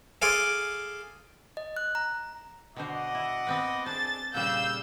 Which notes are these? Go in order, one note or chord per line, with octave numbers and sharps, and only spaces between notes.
G#4 A4 F5 G#5 C6 D6
D#5
F#6
A#5
B2 D3 C5 D#5 F#5 D6
E4
B3 C4 B4
D4 G#4 C5 A5 A6
A#2 C#3 G3 F5 E6 G6